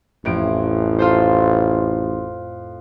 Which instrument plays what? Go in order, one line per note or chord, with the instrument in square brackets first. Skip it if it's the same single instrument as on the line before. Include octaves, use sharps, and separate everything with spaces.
[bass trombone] A1 [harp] F2 A2 D7
[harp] F4 A4 C5